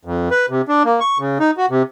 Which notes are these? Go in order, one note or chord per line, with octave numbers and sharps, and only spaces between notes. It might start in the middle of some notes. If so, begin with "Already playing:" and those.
F2
B4
C3
D4
A#3
C#6
C#3
D#4
F#4
C3